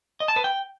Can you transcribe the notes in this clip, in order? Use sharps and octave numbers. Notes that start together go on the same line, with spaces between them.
D#5
A5
B4
G5